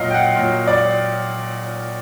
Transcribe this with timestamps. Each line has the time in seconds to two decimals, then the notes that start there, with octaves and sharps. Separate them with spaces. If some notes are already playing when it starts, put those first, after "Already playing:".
Already playing: A#2 F#3 D#5 F5
0.10 G5
0.14 F#5
0.36 A#2 F#3
0.67 D5